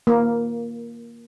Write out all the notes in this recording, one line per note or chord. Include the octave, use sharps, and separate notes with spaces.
A#3